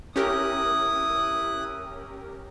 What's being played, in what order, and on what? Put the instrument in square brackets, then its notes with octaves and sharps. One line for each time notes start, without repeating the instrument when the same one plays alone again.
[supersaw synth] C#4 G4 A#4 [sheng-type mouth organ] E4 F#6 [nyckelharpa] D#6